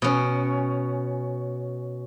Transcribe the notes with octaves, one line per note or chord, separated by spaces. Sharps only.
B2 C#4